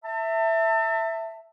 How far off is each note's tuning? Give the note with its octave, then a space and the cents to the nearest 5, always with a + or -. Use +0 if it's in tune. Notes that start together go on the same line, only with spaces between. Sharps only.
E5 +0 A5 +35